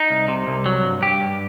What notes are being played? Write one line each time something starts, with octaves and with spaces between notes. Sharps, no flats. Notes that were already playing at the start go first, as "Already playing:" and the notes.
Already playing: D#4
C2
C3
C2
F#3
G2
G2 G4
G2